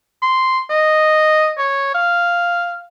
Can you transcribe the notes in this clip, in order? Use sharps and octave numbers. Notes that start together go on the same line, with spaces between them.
C6
D#5
C#5
F5